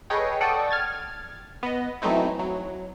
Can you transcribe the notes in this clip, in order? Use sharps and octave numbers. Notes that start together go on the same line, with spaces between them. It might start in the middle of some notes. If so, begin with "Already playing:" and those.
G#4 A4 B4 C#5 D#5 G5
A4 D5 F#5 G5 C#6 D#6
F6 G#6 A6
B3 D#5
E3 F#3 A3 C4 D#4 E4
F#3